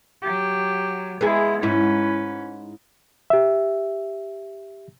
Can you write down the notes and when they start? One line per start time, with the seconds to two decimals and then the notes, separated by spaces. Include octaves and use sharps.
0.23 F#3 G4
1.21 G#3 B3 E4 G#4
1.63 G#2 C#4 E4 B4
3.30 G4 E5